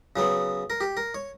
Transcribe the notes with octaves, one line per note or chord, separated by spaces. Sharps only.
C#3 F#3 B3
A#4
G4
A#4
C#5